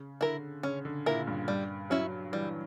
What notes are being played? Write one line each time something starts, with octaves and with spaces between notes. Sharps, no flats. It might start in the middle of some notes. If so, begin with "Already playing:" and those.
Already playing: C#3
D3 E4 A#4
C#3 C#4
D3
A#2 E4 A#4
G2
G2 G3
F#3 C#4 E4
E3 G3